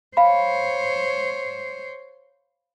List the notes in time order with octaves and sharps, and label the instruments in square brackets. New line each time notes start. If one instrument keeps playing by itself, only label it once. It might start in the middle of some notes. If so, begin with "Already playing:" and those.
[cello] C5 C#5 [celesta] F5 B5